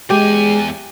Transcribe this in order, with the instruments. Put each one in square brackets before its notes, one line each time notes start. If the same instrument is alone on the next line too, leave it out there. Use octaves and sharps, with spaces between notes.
[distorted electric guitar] E2 G#5 [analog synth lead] G#3 [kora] G4